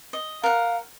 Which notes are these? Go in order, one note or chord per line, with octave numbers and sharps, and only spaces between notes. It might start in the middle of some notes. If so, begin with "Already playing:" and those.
D#5
A#4 F5 F#5